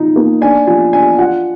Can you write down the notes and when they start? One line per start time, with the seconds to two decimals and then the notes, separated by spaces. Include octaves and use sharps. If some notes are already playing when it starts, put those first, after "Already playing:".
Already playing: B2 F3 D#4
0.16 A#3
0.41 D4 G#5
0.67 F3 G#5
0.93 D4 G#5
1.18 F4 F#5